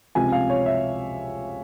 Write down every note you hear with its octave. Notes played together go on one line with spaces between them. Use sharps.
C#2 C3 F3 G#5
F5
C#5
E5